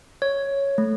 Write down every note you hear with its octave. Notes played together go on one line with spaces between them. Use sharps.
C#5
A3